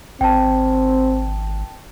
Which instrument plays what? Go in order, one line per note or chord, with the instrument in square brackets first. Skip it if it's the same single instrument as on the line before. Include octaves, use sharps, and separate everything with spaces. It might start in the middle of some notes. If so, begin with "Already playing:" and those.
[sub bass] G#1 [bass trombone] C4 [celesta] G5 A5